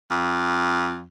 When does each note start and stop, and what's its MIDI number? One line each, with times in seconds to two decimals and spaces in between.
0.11 1.06 41